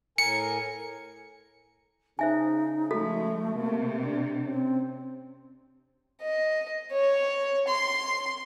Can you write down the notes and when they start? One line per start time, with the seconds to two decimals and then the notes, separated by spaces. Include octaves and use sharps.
0.18 A2 A#4 G#5 C#7
2.19 C#3 D#4 C5 E5 G#5
2.91 F3 G#3 A3 F#4 A4
3.55 C3 A#3
4.04 D4
4.44 C4 C#4
6.22 D#5
6.92 C#5
7.68 C6